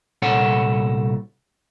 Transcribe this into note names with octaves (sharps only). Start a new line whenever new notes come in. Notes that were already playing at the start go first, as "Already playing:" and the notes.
C2 A#2 A4 C#5 F#5